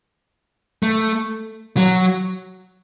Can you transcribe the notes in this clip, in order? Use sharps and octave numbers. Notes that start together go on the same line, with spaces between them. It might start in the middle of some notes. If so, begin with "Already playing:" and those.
A3
F#3